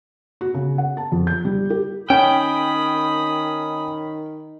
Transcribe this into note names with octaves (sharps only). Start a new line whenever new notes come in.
F#4
C#3
F#5
A5
F2
G6
G3
G4
D#3 C#4 G5 B5 D#6